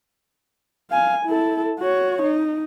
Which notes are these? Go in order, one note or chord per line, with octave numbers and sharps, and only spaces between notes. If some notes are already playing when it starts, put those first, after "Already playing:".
F5 G#5
E4 A4
F#4 C#5
D#4